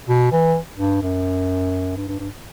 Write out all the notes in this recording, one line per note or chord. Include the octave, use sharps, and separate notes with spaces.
B2
E3
G2
F#2
G2
G2
G2